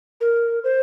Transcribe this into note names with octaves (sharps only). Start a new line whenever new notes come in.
A#4
C5